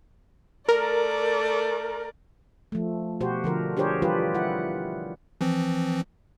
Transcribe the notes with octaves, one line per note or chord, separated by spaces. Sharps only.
A3 A#4 D5
F3 A3
B2 F#4 G4 C5
D3 F3 A#4
D4 G4 G#4 A#4 C5 C#5
E3 G3 F4 G4 B4
E4 F#5
E3 F3 C4